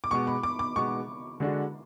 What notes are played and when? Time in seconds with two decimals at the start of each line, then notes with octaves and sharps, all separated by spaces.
0.04 D6
0.11 B2 G#3 B3 C#6
0.27 B5
0.43 D6
0.59 D6
0.76 B2 G#3 B3 C#6
1.40 D3 G#3 D4 F#4